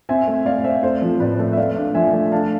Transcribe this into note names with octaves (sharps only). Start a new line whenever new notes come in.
C4 E5 G#5
A3
A3 D5 F5
F5
A3 C5 E5
C4 A4 C5
F3
A2 B4 D5
A3
E5
A3 D5 F5
D4
F3 E5 G#5
A3
D4 F5 A5